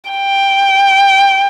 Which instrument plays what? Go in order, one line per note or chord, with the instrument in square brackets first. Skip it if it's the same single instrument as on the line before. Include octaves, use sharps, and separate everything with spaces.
[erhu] G5